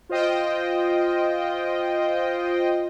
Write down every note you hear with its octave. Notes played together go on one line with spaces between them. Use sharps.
F4 C5 D#5 G5